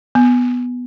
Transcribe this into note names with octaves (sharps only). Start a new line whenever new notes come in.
B3